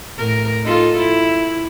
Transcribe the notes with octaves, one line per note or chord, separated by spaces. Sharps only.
A2 A#4
D#4 F4 A4
E4